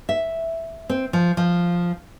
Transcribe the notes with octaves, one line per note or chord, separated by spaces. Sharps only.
E5
C4
F3
F3